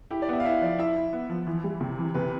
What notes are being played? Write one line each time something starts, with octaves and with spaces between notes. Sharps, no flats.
E4 G4
D5
B3 E5
F5
E4 E5
F3 D5
E4 E5
E4
B3
F3
E3
G3
C3
E3
C3 B4